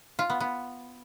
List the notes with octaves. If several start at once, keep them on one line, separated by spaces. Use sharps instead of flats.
F4
B3
B3